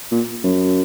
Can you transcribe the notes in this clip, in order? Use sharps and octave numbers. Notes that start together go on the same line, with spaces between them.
A#2
F#2